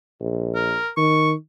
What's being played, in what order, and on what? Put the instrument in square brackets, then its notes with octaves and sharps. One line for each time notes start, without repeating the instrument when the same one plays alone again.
[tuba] A#1
[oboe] A#4
[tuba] D#3 [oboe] C#6